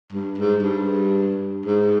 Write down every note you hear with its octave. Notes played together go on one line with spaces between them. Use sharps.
G2
G#2
G2
G#2